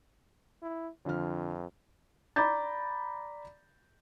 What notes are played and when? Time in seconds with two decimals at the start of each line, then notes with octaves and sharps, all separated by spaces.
0.62 E4
1.06 F2 D3 F3 F6
2.36 D5 A#5 B5 D6 G6 A6